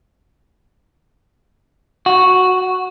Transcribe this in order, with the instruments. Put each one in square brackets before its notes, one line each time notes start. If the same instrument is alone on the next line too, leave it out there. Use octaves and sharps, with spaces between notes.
[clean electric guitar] F#4